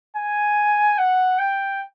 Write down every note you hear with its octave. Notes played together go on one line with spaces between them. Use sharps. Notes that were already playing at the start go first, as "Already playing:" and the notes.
G#5
F#5
G5